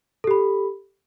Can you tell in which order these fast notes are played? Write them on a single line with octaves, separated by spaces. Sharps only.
A4 G4 B5